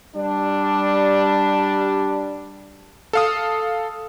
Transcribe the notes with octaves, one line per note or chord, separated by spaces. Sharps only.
G3 D4
A4 F5 D#6